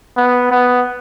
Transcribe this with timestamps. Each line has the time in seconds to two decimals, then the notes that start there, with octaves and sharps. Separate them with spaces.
0.17 B3
0.51 B3